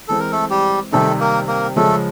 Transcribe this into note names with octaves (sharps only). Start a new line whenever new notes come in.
E3 G#3 C4 A4
A#4
A3 A4
G3 G4
C3 D#3 G3 A3 C4 D#4 A4
A#3 A#4
A#3 A#4
C#3 F3 G#3 A3 C#4 A4